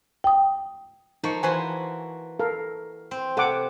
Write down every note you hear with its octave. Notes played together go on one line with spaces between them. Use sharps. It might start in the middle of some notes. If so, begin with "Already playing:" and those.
G5 D#6
F3 A#3 D#4 C#6
E3 F#4 C5 G#5 C6
A4 A#4 F5
C4
C3 A4 F#5 D6